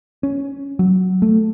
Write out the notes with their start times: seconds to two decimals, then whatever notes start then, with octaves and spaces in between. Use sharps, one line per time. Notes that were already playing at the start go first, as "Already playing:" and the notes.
0.23 C#4
0.79 F#3
1.22 A3